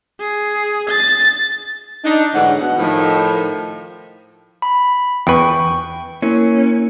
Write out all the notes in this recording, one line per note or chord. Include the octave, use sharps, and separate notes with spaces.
G#4
A6
D4 D#4
D2 G#2 D3 E3 C#5 F#5
B2 F#5
A2 D#3 F3
B5
E2 B4 G5 C#6
A#3 C#4 E4 A#4